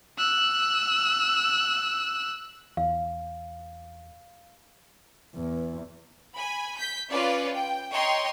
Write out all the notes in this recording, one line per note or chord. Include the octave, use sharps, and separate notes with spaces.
E6 F#6
E2 F5
E2
G#5 B5
G6 B6
C#4 F4 B4 D5
G5
C#5 D#5 G5 A#5 C6